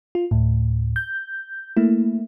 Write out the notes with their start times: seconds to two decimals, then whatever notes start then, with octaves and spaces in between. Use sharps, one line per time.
0.15 F4
0.31 D2 A2
0.96 G6
1.77 A3 A#3 E4